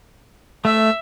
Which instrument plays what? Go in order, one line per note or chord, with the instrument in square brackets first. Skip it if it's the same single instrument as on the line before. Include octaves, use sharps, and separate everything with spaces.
[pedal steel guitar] A3 [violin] E5